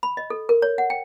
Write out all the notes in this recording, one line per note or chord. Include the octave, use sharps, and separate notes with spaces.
B5
D#5
A4
A#4
C#5
F#5
G5